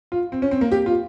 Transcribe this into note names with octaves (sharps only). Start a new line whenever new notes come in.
F4
C4
C#4
C4
A#3
G4
F4